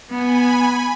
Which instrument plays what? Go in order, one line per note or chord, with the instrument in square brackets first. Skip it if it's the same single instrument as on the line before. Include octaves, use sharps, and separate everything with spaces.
[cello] B3 [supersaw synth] G#5 B5